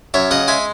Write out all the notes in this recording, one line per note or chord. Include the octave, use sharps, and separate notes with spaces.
F#2 C#5 E5
C#3 D#5 F#5
G#3 E5 G#5